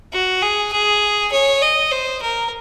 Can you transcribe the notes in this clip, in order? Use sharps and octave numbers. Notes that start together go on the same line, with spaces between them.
F#4
G#4
G#4
C#5
D#5
C5
A#4